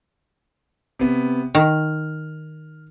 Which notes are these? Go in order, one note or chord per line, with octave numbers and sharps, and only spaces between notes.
C3 B3
D#3 F6